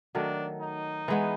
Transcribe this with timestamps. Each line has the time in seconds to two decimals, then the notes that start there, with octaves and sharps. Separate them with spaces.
0.15 D#3 F#3 A3 D4
0.61 D#4
1.08 E3 G#3 B3